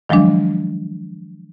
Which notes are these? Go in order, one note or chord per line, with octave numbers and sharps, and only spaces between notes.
D#3 F3 F#3 G#3 D4